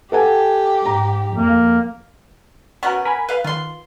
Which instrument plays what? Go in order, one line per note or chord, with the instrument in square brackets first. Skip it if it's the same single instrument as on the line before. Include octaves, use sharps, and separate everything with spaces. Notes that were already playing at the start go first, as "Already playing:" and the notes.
[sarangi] G4 [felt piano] A4 F#5 G#5
[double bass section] G#2 [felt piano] A#5
[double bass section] F2 [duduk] A#3
[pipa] B3 C#4 F#5 [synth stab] F#4 A#4
[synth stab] A#4 G#5 B5
[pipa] B4 F5
[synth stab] D#3 [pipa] F4 C6